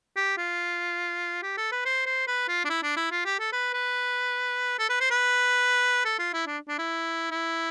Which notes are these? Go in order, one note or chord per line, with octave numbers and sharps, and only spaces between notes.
G4
F4
G4
A4
B4
C5
C5
B4
F4
D4
E4
D4
E4
F4
G4
A4
B4
B4
A4
B4
C5
B4
A4
F4
E4
D4
D4
E4
E4